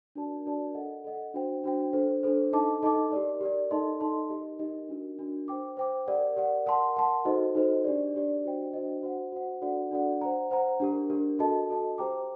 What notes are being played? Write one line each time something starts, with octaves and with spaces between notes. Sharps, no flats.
D4 F#4 A#4 D5 A5
D4 F#4 A#4 D5 A5
A4 D#5 F#5
A4 D#5 F#5
D4 F#4 C5 G5
D4 F#4 C5 G5
D4 A4 C5
D4 A4 C5
D#4 A4 D#5 A5 D6
D#4 A4 D#5 A5 D6
G4 A#4 D5
G4 A#4 D5
D#4 A4 D#5 A5 C6
D#4 A4 D#5 A5 C6
D#4 G4 A#4 D#5
D#4 G4 A#4 D#5
D4 F#4 A#4
D4 F#4 A#4
C5 G5 D6
C5 G5 D6
G4 A#4 D5 F#5
G4 A#4 D5 F#5
A#4 F#5 A5 C6
A#4 F#5 A5 C6
D#4 F#4 A4 C5 D#5
D#4 F#4 A4 C5 D#5
D4 G4 D5
D4 G4 D5
D4 F#4 C5 D#5 G5
D4 F#4 C5 D#5 G5
F#4 C5 F#5
F#4 C5 F#5
D4 F#4 A4 D5 F#5
D4 F#4 A4 D5 F#5
C5 F#5 A#5
C5 F#5 A#5
D4 G4 A#4
D4 G4 A#4
F#4 A4 D#5 A5
F#4 A4 D#5 A5
G4 C5 G5 A#5 D6